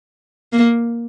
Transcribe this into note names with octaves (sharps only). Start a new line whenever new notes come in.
A#3